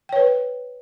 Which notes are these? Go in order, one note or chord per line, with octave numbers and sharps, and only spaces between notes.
B4 C#5 G5